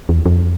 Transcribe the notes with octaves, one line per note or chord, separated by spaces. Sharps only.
E2
F2